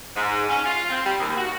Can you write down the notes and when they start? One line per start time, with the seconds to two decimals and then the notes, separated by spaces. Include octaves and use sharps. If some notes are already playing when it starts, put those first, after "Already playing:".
0.16 G#2
0.49 C#4
0.66 F4
0.90 C4
1.05 G3
1.20 D#2
1.37 F#4